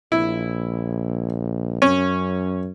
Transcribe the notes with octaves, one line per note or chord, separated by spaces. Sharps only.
A#1 E4
F#2 C#4